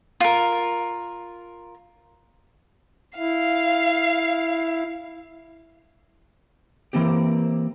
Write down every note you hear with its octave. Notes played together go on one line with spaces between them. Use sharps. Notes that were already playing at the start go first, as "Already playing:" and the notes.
F4 A#4
E4 F5
E3 A#3 C4 G4